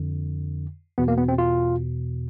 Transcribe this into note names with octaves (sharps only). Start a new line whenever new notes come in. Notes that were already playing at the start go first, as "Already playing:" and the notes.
Already playing: F2 D3
E2 B2 B3
A#3
B3
C4
F4